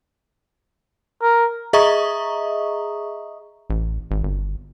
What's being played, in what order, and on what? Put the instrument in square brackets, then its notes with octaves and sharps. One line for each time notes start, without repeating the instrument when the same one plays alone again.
[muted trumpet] A#4
[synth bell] G#4 D#5 E5 A#5 C#6 D#6
[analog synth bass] A1
G#1
G1